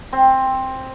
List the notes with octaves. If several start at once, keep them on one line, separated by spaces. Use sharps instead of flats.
C4